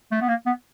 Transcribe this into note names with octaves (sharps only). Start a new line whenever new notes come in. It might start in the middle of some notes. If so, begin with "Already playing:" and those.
A3
B3
A#3
B3